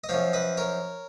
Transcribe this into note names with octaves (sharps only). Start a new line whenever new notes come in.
D#5
F#2 F3 C#5 F5
B4 D#5
A#4 C#5